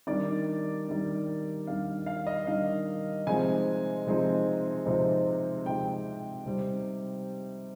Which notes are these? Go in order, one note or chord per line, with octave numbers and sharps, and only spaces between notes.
D#3 G3 D4 D5
D#3 G3 D4
D#3 G3 D4 F5
F5
D#5
D#3 G3 D4 F5
C3 F3 G#3 C4 D#4 G#5
C3 F3 G#3 C4 D#4
C3 F3 G#3 C4 D#4
C3 F3 G#3 C4 D#4 G5
C3 G3 C4 D#4